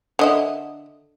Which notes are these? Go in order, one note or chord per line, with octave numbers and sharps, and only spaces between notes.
D3 D#5 E5